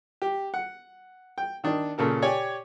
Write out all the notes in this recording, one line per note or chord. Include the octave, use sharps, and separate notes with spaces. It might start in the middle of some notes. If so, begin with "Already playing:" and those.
G4
F#5
G5
D#3 D4
A#2 C#3 A4 A#4
G4 C#5 D5 G#5